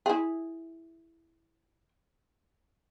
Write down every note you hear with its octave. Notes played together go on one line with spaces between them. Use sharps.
E4 G#4